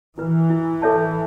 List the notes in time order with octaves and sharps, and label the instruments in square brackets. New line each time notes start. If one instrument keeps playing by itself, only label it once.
[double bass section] E3 [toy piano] E4 B4
[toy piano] E4
A4 C#5 E5 A5